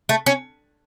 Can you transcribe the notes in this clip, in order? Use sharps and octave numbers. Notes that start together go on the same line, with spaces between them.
A3
C#4